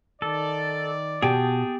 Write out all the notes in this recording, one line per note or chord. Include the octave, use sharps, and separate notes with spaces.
D#3 A4 D5
B2 G4 G#4 G5 A5